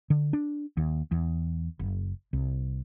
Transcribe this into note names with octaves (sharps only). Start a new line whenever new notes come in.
D3
D4
D#2
E2
F#1
C2